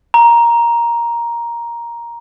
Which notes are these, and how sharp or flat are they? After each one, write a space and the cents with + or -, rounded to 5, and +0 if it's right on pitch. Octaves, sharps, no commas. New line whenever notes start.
A#5 +10